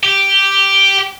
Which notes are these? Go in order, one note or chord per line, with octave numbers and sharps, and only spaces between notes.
G4